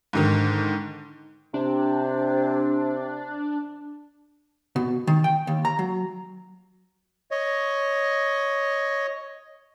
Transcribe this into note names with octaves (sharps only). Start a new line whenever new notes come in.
G#2 D3 D#3
C3 D4
B2
D#3
G5
D#2
A#5
F#3
C#5 D#5